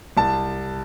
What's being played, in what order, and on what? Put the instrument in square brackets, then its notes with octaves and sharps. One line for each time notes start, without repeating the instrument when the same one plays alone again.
[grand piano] C2 A5